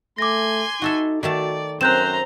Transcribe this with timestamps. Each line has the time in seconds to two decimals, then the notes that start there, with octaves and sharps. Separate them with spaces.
0.18 A3 G#5 C6 D6 A#6
0.82 D#4 F#4 A4 E5
1.23 D#3 A3 F#4 D5 A5
1.81 F#2 C4 C5 A#5 F#6 G6 E7